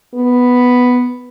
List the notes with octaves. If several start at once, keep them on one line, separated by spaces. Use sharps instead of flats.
B3